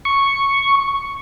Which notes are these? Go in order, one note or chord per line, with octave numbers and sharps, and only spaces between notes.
C#6